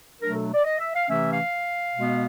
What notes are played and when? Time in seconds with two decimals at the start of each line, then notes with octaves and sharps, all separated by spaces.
0.20 B2 F#3 A3 D4 A#4
0.32 A4
0.53 D5
0.64 D#5
0.79 E5
0.94 F5
1.08 C3 E3 A3 C#4 E5
1.31 F5
1.96 B2 G#3 B3